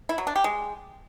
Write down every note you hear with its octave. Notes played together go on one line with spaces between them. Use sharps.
E4
F#3
D4
G4
G#3